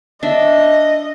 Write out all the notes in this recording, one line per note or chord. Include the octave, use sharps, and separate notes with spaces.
D4 D#5 E5